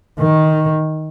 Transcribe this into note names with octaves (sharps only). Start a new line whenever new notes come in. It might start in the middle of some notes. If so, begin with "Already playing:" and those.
D#3